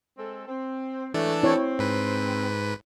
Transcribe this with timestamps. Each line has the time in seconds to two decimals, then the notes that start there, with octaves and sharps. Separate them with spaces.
0.18 G#3 C4 A4
0.48 C4
1.14 G#2 E3 F#3 A3 D4 A4
1.43 C4 E4 C#5
1.79 G#2 B4